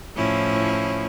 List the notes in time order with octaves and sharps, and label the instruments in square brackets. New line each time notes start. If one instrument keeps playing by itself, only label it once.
[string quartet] A2 F3 C#4 E4